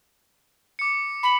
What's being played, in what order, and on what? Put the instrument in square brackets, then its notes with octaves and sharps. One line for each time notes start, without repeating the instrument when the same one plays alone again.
[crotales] D6 C#7
[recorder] B5